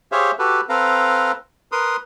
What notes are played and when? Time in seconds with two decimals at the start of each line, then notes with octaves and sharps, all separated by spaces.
0.12 G4 G#4 C5 C#5 E5 F5
0.39 F#4 G4 A4 B4
0.69 C4 A4 B4 F5 A#5
1.72 A#4 B4 C6 D#6